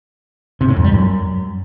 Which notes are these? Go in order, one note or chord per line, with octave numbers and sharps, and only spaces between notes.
C3
A2
F2
G3
F#2